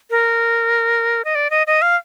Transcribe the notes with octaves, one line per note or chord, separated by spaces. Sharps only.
A#4
D#5
D5
D#5
D#5
F5